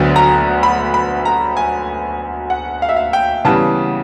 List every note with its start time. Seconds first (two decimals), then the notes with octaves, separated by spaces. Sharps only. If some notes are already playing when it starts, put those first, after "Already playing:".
Already playing: D2 D3 F#3 B3
0.16 A#5
0.63 B5
0.94 B5
1.25 A#5
1.57 G#5
2.50 F#5
2.82 F5
2.89 E5
2.96 F5
3.13 G5
3.45 C#3 E3 G3 B3 A5